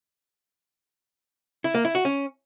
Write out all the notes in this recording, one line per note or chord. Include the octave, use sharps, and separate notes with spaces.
E4
A#3
E4
F#4
C#4